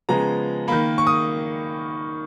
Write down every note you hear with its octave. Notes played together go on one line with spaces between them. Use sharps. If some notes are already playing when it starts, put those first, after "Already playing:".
C#3 F3 G#3 B3 A#5
D#3 A#3 B5
C#6
D#6